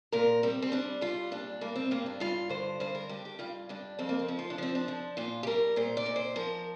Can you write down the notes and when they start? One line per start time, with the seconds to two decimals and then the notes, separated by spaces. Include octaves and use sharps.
0.12 A#2 A#4
0.43 G3 C4
0.62 C4
0.72 G3 D4
1.01 G3 F4
1.32 A#2 D4
1.61 G2 A#3
1.76 C4
1.91 G2 A#3
2.06 D4
2.20 G2 F4
2.49 D3 C5
2.80 G2 C5
2.95 A#4
3.09 G2 G4
3.25 G4
3.39 G2 F4
3.69 G2 D4
3.99 F2 C4
4.09 A#3
4.19 C4
4.28 F3
4.39 F4
4.50 D4
4.58 F3 C4
4.75 D4
4.88 F3
5.17 A#2 F4
5.43 G4
5.47 G3 A#4
5.76 A#2 C5
5.97 D5
6.06 A#2
6.16 C5
6.36 F3 A#4